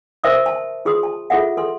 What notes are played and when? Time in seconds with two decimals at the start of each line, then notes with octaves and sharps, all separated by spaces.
0.24 A#4 C5 E5 C6 D6 D#6
0.46 A5
0.85 F4 G#4 C6 D#6
1.03 A5
1.30 F4 G#4 A4 E5 F#5
1.57 A4 C6